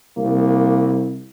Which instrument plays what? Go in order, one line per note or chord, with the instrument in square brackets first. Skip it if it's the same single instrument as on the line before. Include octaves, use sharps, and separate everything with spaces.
[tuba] C2 [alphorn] A#3